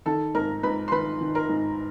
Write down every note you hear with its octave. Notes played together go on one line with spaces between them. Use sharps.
D#3 A4 A5
G#2 A#4 A#5
G#2 B4 B5
C6
D#3 B4 B5
D#3
A#4 A#5
G#2